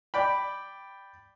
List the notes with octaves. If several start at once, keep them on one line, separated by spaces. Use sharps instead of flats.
D5 G5 B5